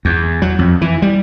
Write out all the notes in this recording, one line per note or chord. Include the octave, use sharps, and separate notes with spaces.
E2
F#3
F2
E3
G3